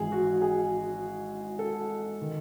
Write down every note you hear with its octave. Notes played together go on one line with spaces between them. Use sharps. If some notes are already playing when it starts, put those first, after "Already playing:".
Already playing: G#1 G#2 E3 G#4
F#4
G#4
A4
D#3